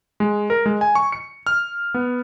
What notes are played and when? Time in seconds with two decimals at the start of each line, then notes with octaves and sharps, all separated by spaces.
0.20 G#3
0.50 A#4
0.66 G#3
0.81 G#5
0.95 C#6
1.12 C#7
1.47 F6
1.94 B3